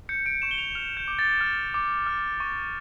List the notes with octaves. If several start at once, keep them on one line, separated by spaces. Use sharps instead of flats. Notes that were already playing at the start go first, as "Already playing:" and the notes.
G6 C#7
D7
C#6 E7
G7
F7
F6 F7
G6
D6
A6
F6
D6
F6
C#6